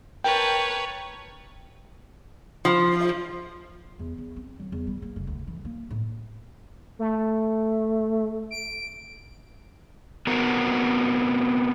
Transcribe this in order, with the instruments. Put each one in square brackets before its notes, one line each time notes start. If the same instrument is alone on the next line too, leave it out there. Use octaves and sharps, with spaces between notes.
[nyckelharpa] A#4 A5 [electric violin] B4 C#5 [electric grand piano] G5
[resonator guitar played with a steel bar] F3
[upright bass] E2
E2
C4
F#3
E2
G3
A#3
F1
D2
E3
A#3
A2
[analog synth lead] A3
D7
[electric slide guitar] B3 C4 F#4 A#4